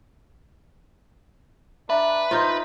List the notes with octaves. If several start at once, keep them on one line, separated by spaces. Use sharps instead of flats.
D4 B4 E5 A#5
D#4 F4 C5